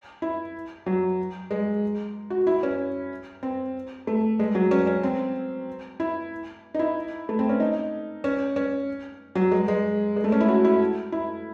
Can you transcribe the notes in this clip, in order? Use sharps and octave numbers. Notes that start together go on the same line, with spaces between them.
E4
F#3
G#3
F#4
E4
C#4
C4
A3
G#3
F#3
C#4
C#4
C4
E4
D#4
E4
A3
C4
C#4
D#4
C#4
C#4
F#3
G#3
G#3
G#3
A3
C#4
E4
F#4
E4
E4